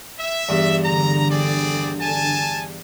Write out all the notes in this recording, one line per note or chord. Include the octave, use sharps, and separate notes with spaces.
E5
E2 G2
D3 A#5
C4 G#4 D5
G#5 A5